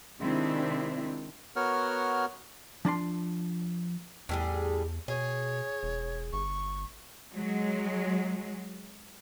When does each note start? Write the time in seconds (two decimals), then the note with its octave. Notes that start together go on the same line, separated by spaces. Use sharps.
0.20 C3 D#3 G#3 C4 D4 E4
1.56 B3 F#4 A#4 C#5 F#5 F6
2.85 F3 D4 A5 C6
4.29 E2 A2 G3 G#4
5.08 B2 G#4 C#5
5.83 E1
6.33 G1 C#6
7.34 F#3 G#3